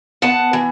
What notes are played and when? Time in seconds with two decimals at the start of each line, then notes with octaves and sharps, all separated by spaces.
0.22 B3 F#5 A5
0.53 E3